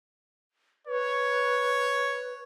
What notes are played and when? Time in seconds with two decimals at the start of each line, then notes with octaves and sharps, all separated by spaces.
0.87 B4 C#5